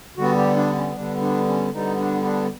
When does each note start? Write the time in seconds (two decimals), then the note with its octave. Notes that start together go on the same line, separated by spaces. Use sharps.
0.17 D3 G3 B3 F#4
0.37 G4
0.57 D4
0.77 C#4
0.95 D3 G3 B3 D4
1.22 D4
1.48 C#4
1.73 D3 G3 B3 D#4
2.00 D4
2.25 D4